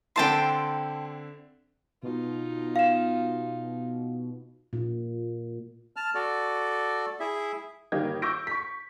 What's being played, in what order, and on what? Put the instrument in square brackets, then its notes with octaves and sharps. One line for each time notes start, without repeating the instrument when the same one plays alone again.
[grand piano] D3 C4 E4 [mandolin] G5 A5 C6
[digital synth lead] B2 [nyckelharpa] D#4 F4
[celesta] F5 E7
[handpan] A#2
[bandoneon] A5 F6
F#4 A4 D5
E4 G#4 E5
[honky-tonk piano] G1 D#3 A#3 G4 D#5 G#6
C#6 D6 E6 G6 A#6 D7
C#6 B6